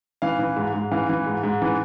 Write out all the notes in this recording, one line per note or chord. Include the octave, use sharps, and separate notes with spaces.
E3 F5
E3
G#2
G#2
E3 F5
E3
G#2
G#2
E3